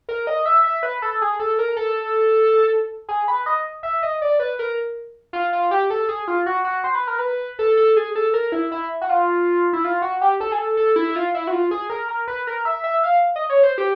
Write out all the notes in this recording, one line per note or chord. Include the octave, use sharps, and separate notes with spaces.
A#4
D#5
E5
E5
B4
A4
G#4
A4
A#4
A4
G#4
B4
D#5
E5
D#5
D5
B4
A#4
F4
F4
G4
A4
G#4
F4
F#4
F#4
C5
B4
A#4
B4
A4
A4
G#4
A4
A#4
E4
E4
F#4
F4
E4
F4
F#4
G4
A4
G#4
A4
A4
E4
E4
F4
E4
F#4
F4
G#4
A#4
A#4
B4
A#4
E5
E5
F5
D#5
C#5
C5
G4